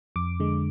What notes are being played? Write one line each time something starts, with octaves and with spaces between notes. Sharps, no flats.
F2 D6
D3 G#3